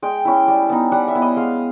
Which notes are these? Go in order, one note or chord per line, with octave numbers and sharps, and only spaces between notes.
G#3 G5
C#4 E4
G3
B3 D#4
G3 F#5
E5
B3 E4
D#5
G#3 F5